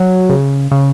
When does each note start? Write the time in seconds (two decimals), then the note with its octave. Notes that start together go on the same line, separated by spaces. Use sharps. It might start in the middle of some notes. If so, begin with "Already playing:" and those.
Already playing: F#3
0.29 C#3
0.71 C#3